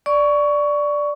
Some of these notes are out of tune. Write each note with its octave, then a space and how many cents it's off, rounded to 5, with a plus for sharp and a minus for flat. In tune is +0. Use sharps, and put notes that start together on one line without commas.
D5 +0 C#6 +15